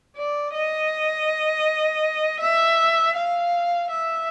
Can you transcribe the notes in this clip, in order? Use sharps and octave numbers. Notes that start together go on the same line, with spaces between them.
D5
D#5
E5
F5
E5